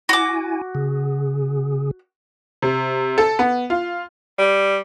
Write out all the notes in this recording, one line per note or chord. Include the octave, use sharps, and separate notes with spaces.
E4 F#4 G#5 D6
C#3 G#4
C3
A4
B3
F4
G3